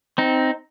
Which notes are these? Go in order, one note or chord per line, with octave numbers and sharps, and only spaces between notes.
C4 D#4